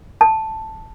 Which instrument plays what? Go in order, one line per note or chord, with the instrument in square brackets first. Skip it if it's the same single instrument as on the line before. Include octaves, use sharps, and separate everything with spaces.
[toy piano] A5